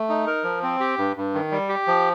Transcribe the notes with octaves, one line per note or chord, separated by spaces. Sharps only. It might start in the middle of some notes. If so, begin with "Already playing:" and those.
Already playing: A3
D#4
A#4
F3
C4
G4
G2
G2
D#3
G3
G4
F3